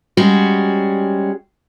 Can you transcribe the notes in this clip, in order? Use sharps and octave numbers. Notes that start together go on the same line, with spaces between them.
G3 G#3 C#4 F#4